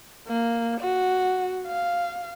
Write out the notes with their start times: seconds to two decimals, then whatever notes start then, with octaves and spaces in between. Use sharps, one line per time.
0.28 A#3
0.81 F#4
1.67 F5